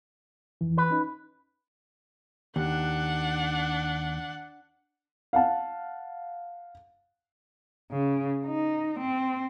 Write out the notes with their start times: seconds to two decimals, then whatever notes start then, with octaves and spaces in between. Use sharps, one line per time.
0.61 F2 E3
0.77 B4
0.90 C#4 D#4
2.56 D#2 D4 F#5
5.33 F5 F#5 A5
7.91 C#3
8.46 D#4
9.00 C4